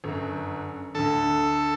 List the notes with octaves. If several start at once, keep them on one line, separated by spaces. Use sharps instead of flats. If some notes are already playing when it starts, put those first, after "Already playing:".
G1 F#2
D2 D3 A4